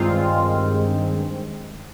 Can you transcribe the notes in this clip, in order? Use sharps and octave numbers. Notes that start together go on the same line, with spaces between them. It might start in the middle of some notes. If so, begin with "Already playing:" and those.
Already playing: G2 D#3 G#3 C4 F4